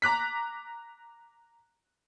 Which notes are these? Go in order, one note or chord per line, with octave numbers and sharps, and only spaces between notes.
A#5 D6 F#6 B6